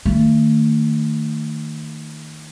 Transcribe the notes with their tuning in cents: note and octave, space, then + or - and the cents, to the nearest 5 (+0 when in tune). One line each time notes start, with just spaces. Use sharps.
D#3 -10 A3 +40